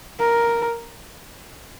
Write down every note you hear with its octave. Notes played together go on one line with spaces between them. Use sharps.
A#4